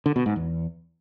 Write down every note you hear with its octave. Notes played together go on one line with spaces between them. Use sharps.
D3
B2
G#2
E2